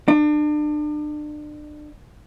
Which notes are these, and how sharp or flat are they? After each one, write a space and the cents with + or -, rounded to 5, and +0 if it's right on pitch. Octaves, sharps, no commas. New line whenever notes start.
D4 +35